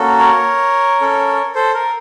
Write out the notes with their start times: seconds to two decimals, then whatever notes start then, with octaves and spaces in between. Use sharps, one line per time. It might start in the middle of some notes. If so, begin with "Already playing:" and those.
Already playing: A#3 C#4 F#4 A4
0.19 A#4 C#5
1.01 C#4 A4
1.55 A4 C5
1.74 A#4